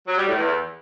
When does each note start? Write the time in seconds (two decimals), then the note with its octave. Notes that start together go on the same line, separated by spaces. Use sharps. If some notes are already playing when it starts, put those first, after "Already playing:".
0.07 F#3
0.17 G3
0.27 A2
0.37 E2